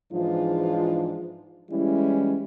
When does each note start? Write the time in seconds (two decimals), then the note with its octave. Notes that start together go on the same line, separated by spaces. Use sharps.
0.12 G#2 E3 F3 G#3 D4 F4
1.70 E3 G3 G#3 C#4 E4